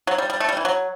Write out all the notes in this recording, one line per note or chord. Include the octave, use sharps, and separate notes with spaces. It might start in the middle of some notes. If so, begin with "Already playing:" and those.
F#3
G3
G3
A3
G3
E3
F#3